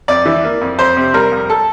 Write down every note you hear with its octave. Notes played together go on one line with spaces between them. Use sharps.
F2 D5
E3
A#3
F2
F2 C5
C3
G3 A#4
F2
A4